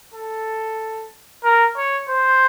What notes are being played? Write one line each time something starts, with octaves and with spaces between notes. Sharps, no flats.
A4
A#4
C#5
C5